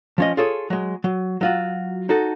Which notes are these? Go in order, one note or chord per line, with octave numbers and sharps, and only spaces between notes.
F3 C#4 D#5
F4 G#4 A4 C#5
F#3 G#3
F#3
F#3 F4 F#4
D#4 F#4 A4